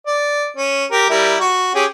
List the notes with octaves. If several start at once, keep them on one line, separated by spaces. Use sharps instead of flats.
D5
C#4
G4 A#4
G3 E4 A#4
F#4
C#4 G4 G#4